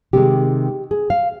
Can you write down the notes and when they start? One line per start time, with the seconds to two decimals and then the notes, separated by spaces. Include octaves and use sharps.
0.13 C3 D#3 G#3 G4
0.91 G#4
1.10 F5